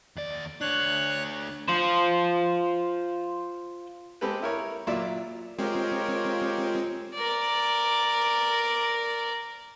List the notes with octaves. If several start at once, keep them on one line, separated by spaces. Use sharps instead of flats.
D#2 D5
A3 D4 C#5 F#6
F4 C5
G#3 C4 G4 A4 B4
E4 A#4 C#5
A#2 F#3 F4 D5 E5
G#3 C4 F4 G4 A#4 C#5
A#4 D5